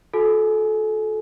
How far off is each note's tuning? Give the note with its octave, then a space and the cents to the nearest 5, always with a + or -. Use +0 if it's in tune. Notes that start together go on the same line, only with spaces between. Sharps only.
F#4 -45 A4 -25 G#5 +30